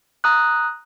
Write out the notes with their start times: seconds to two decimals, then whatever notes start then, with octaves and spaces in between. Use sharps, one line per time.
0.24 A#5 D#6 F#6